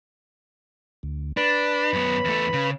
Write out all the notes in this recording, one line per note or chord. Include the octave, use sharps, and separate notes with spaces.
D2
D4 B4 B5
F#2 B3
E2 A3
C#3